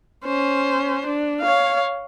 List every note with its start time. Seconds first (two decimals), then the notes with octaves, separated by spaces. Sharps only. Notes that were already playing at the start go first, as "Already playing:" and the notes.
0.25 C#4 C5
1.06 D4
1.41 C#5 F5